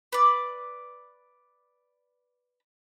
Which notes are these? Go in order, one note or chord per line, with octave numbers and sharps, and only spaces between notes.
B4 D5